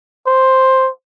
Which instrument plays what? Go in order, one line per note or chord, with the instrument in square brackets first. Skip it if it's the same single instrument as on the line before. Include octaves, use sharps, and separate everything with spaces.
[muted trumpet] C5